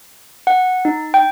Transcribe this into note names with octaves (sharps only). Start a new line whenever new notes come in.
F#5
D#4
G5